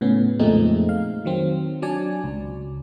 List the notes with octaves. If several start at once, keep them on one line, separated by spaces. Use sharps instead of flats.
A2 C#3 B3 C#4
F2 A#2 G#3 A3 C4 D#4
F5
D#3 F#3 C4
F#3 D4 D5 G#5
C#2